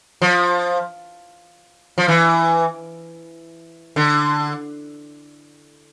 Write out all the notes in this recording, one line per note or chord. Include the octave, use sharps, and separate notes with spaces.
F3
F3
E3
D3